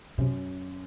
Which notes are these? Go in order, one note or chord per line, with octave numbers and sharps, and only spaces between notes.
F#2 C3